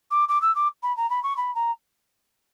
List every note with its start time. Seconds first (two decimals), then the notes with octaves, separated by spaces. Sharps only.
0.11 D6
0.28 D6
0.42 E6
0.55 D6
0.83 B5
0.96 A#5
1.10 B5
1.23 C#6
1.37 B5
1.55 A#5